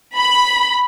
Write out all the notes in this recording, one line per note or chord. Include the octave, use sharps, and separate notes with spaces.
B5